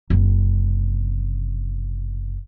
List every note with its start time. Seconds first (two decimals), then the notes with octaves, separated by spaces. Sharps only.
0.10 F#1 C3